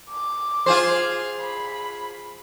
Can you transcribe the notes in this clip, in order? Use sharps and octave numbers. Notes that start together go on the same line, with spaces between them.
D6
F4 G#4 C5
B5